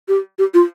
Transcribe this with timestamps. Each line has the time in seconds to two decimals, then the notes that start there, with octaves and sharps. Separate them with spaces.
0.08 G4
0.39 G4
0.54 F4